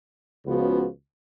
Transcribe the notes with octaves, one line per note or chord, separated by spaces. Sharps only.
C#2 C#3 F3 B3 F#4